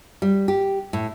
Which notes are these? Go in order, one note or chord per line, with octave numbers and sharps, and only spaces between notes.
G3
G4
A2